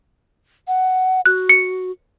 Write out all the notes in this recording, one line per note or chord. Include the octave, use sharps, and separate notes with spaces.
F#5
F#4 F#6
C#7